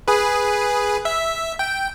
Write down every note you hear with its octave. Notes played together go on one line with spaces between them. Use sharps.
G#4 B4
E5
G5